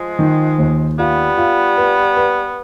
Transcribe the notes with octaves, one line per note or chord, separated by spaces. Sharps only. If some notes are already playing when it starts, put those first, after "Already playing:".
Already playing: F3 G#3
D#3
D#2
G3 B3 F4
F4
B4
B4